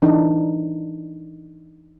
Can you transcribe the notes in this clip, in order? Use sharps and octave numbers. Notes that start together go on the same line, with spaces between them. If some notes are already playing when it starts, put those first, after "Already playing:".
E3 D4 D#4